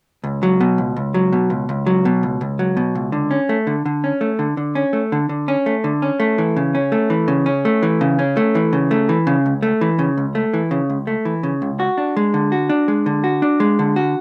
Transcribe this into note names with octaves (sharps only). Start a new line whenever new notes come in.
C#2
F#3
B2
C#2
C#2
F#3
B2
C#2
C#2
F#3
B2
C#2
C#2
F#3
B2
C#2
D3
C#4
A3
D3
D3
C#4
A3
D3
D3
C#4
A3
D3
D3
C#4
A3
D3
C#4
A3
E3
C#3
C#4
A3
E3
C#3
C#4
A3
E3
C#3
C#4
A3
E3
C#3
A3
E3
C#3
C#2
A3
E3
C#3
C#2
A3
E3
C#3
C#2
A3
E3
C#3
C#2
F#4
D4
G#3
D3
F#4
D4
G#3
D3
F#4
D4
G#3
D3
F#4